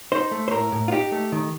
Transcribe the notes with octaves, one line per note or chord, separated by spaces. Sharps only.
D#4 C5
A3
C5
A2 A#4
A2
F4
D#4 G4
A3
D#3